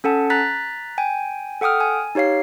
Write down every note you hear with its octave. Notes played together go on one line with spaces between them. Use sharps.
C#4 A4 F#5 A5
A#5 F#6 A6 B6
G5 G#5
A4 F#5 G5 D#6 F6
G#5
D#4 G4 C#5 F5 C7